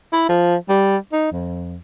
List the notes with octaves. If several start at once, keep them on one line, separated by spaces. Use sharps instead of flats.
E4
F3
G3
D#4
F2